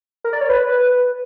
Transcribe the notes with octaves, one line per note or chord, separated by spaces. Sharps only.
A#4
D5
C#5
B4